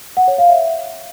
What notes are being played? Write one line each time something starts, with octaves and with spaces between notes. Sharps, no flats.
F#5
C#5
F5
E5